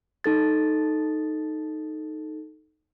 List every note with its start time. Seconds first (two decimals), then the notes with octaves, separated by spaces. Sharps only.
0.24 D#4 A4 A6